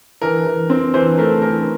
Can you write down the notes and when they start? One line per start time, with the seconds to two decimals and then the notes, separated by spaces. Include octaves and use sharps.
0.21 E3 A#4
0.46 E3
0.70 C4
0.94 E3 C5
1.18 A3 A#4
1.41 E3 A#4